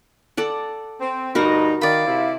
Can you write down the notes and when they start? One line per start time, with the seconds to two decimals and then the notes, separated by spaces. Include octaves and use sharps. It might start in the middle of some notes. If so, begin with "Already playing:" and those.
0.37 A4 D5 F#5
1.00 C4
1.35 D2 G2 D#4 F#4 A#4 F#5 B5
1.81 D#3 D5 F5 B5
2.07 C3 E4